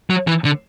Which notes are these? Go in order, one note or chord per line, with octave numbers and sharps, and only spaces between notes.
F#3
E3
D3